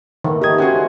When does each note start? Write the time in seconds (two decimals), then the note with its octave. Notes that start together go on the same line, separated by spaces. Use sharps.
0.24 D#3 A3 B3
0.41 G4 B4 D5 D#5 A5 D#6 G#6
0.58 C4 C#4 F#4 G#4